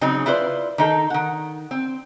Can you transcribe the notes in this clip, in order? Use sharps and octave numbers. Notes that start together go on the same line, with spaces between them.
C#3 F#3 C4 D#4 G#4
E4 F4 B4 C5 D5
D#3 D#4 A4
D#3 F#5
C4